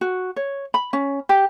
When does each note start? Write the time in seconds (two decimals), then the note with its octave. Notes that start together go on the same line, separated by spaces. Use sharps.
0.01 F#4
0.36 C#5
0.74 B5
0.93 C#4
1.29 G4